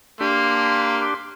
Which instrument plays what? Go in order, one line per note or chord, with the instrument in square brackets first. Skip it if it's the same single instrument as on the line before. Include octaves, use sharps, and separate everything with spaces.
[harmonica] A#3 [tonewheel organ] D4 G4 [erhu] C6